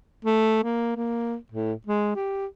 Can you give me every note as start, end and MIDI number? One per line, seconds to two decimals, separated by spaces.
0.25 0.63 57
0.64 0.96 58
0.96 1.36 58
1.52 1.73 45
1.87 2.14 56
2.15 2.46 67